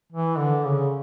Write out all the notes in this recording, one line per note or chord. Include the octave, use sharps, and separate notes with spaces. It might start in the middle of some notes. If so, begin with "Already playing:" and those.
E3
D3
C#3